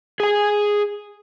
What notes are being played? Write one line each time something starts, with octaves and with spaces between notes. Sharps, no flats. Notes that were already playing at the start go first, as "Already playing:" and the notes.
G#4 G#5